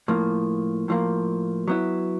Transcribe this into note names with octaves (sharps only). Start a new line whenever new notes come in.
A2 F3 A#3
A2 F3 A#3
F#3 B3 E4